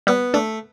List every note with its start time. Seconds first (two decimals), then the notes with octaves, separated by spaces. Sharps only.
0.07 G3 B3
0.34 A3 D4